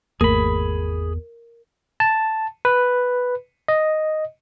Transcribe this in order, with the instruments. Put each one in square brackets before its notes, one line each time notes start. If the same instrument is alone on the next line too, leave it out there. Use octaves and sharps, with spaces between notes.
[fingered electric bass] G#1 A3 A#3 [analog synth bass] E2 [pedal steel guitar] G#4 B5 [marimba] A#4
[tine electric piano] A5
B4
D#5